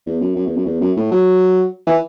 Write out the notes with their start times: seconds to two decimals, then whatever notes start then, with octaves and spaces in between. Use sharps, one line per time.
0.06 E2
0.21 F#2
0.36 F#2
0.47 E2
0.56 F#2
0.66 E2
0.81 F#2
0.96 A2
1.11 F#3
1.87 E3